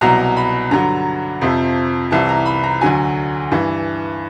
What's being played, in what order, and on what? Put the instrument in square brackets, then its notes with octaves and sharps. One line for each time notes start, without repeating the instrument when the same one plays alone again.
[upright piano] C2 B2 F#3 A#5
B5
G2 D3 F#3 A#5
F2 C3 F3
C2 C3 E3 A5
A#5
B5
A#5
D2 D3 F#3 G#5
G2 E3